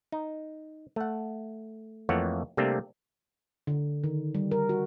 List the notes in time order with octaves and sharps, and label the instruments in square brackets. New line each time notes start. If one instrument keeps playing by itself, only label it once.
[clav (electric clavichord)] D#4
A3 F#5
F2 E3 A3 A#3 C#5 F#5
C3 G3 A3 A#3 C4 D4
[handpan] D3
D#3
G3
A#4
F#4